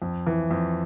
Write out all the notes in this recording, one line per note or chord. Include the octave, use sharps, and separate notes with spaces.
F2
E3
F2